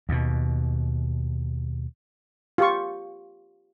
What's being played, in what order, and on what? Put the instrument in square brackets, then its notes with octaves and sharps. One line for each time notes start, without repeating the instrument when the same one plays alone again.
[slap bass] D#2 B2
[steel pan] F4 G4 C#6